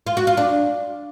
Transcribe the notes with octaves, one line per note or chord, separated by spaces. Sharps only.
F4
F#4
F4
D4